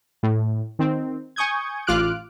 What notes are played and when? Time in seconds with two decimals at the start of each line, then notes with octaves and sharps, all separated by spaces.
0.23 A2
0.79 D#3 C4
1.36 G#5 C#6 D#6 G6 G#6
1.87 A1 F4 D6 F6 F#6 D7